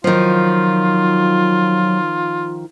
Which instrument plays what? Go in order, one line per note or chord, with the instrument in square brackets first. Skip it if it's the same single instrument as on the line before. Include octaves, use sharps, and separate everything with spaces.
[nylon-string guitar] D#3 F3 [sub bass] F#3 [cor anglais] F4